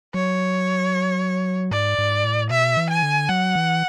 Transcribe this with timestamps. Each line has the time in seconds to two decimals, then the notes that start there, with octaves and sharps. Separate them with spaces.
0.14 F#3 C#5
1.71 G#2 D5
1.98 G#2
2.24 A2
2.50 B2 E5
2.77 E3
2.90 G#5
3.03 D3
3.29 F#3 F#5
3.55 E3